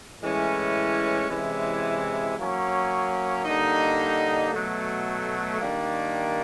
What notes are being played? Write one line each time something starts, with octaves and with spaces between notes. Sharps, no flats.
A2 E3 G#3 C#4 E4
C3 E3 G#3 C#4 E4
F#3 A#3 C#4
D3 G3 A#3 D#4
B2 F#3 A3
D#3 G3 A#3 D4